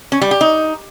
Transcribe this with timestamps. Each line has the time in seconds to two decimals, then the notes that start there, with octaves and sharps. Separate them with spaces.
0.12 C#4
0.21 G3
0.31 G4
0.41 D#4